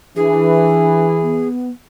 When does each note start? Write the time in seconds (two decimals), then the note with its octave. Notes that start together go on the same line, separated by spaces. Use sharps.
0.16 E3 D4 G#4
1.22 B3